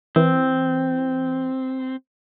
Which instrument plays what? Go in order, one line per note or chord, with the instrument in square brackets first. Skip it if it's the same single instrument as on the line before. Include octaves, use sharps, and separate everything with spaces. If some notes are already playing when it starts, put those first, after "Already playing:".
[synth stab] E3 [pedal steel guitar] C4